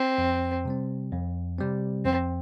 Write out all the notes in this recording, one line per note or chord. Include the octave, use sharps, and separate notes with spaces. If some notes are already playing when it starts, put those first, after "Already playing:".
Already playing: C4
F2
C3 G3 C4
F2
C3 G3 C4
F2 C4